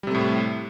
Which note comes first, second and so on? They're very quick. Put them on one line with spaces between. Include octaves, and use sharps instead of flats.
G3 C3 A3 A2